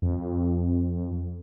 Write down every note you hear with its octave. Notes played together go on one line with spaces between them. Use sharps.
F2